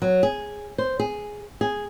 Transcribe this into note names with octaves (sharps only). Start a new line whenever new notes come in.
F#3
G#4
C5
G#4
G#4